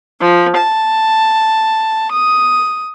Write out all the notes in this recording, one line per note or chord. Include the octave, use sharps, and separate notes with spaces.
F3
A5
D#6